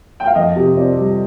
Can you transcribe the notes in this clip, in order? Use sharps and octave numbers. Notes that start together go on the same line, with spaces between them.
G5
F5
F2 D#5
C3
C4 D5
G3